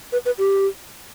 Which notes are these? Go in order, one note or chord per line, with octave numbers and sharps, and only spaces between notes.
B4
B4
G4